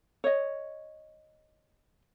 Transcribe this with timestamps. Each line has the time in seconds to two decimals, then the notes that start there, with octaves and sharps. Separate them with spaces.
0.24 C#5 D#5